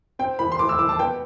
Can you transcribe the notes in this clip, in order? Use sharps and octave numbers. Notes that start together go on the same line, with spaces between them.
C4 G5
E3 B5
C6
E3 D6
E6
E3 D6
A5
B3 G5